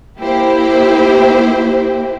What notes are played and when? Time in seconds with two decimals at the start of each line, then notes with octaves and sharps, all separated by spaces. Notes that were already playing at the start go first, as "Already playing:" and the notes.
0.18 A#3 E4 G4 C5